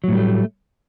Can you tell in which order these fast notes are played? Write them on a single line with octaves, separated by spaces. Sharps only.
F#3 A2 G3 A3